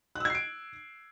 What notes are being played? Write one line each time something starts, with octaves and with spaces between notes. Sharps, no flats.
E6 F#6 G#6 C7 D7